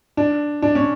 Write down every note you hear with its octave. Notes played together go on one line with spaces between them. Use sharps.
D4
D4
C#4